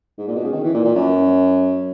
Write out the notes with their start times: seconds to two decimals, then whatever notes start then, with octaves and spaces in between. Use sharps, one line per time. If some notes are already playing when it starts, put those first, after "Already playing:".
0.18 G#2
0.28 A#2
0.36 B2
0.44 C#3
0.52 D#3
0.64 E3
0.74 A#2
0.84 A#2
0.95 F#2